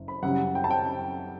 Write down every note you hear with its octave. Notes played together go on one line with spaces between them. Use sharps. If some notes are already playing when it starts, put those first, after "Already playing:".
Already playing: F#1
B5
F#1 F#2 C#3 G3 F#5
G5
A5
G5